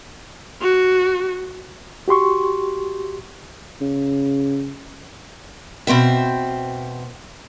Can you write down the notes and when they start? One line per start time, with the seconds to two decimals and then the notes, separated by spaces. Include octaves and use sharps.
0.62 F#4
2.08 F#4 G4 C6 C#6
3.81 C#3
5.87 B2 C4 C5 E5